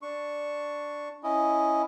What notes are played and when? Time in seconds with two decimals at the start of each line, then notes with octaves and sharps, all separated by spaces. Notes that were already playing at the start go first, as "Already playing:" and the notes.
0.02 D4 C#6
1.23 C#4 E4 D#5